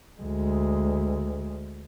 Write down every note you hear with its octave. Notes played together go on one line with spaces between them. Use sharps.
D2 G#3